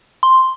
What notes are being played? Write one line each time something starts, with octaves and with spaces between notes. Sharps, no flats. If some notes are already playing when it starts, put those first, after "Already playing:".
C6